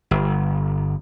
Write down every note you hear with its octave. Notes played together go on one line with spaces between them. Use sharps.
G1